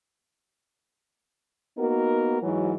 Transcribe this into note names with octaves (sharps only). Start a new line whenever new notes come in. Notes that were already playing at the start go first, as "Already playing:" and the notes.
A#3 B3 D#4 F#4 A#4
G#2 E3 F#3